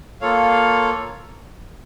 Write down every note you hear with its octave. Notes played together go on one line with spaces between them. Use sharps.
A#3 F4 A4 C#5 F5